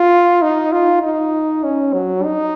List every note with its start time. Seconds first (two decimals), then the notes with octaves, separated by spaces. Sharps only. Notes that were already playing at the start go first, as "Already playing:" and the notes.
Already playing: F4
0.42 D#4
0.72 F4
1.03 D#4
1.63 C#4
1.93 F#3
2.24 D#4